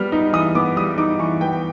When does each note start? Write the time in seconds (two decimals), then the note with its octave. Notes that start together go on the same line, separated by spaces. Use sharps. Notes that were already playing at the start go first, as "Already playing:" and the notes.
Already playing: G3 B3 F6
0.12 D#4
0.33 E3 D#6
0.55 B3 D6
0.76 G3 D#6
0.98 D#4 D6
1.19 E3 C#6
1.41 B3 G5